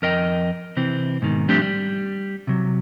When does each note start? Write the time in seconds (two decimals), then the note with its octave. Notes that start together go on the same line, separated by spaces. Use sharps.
0.02 F2 A#4 D#5 G5
0.77 C3 E3 C4
1.22 G#2 B2 D#3
1.49 F3 G3 A3 C4 D4 G4
1.62 G3
2.47 C3 F#3